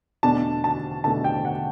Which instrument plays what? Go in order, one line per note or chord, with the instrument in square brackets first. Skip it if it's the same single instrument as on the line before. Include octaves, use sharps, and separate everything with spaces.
[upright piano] E2 B2 A3 D4 A5
A5
E2 B2 A3 D4 A5
G5
F#5